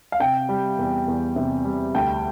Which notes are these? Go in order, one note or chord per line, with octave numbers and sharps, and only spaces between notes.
F5
C3 G5
G3
E2
E2
C3
G3
D2 G5